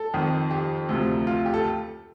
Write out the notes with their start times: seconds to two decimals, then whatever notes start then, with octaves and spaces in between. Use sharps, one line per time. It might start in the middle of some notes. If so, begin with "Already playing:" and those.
Already playing: A4
0.14 F2 D#3
0.51 G4
0.89 D2 C3 F3
1.27 F4
1.46 G4
1.54 A4